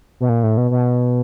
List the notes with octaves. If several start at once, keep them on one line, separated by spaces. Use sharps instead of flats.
B2
A#2
A2
B2
B2